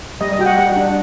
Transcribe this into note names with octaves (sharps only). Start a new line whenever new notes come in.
G3 D#5
D#5
F#4 G5
F#5
G3 F#5
D4